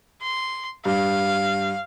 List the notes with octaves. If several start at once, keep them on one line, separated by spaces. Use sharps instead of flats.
C6
G2 F5